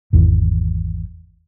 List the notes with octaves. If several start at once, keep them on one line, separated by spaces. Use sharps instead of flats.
G#1 E2 E3